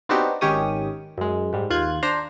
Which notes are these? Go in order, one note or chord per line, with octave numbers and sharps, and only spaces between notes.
B3 C4 D4 D#4 F#4 G4
G#1 D#3 C#4 G4 C#5 D#6
F#2 G#3
G#2 G3
D#2 F4 F#6 G#6
D4 C5 A#5